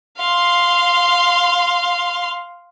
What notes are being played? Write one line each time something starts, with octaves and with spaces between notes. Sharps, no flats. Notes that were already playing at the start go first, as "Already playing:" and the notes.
F5 C6